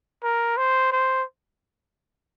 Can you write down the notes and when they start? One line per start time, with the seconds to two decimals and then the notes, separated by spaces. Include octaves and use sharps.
0.23 A#4
0.57 C5
0.92 C5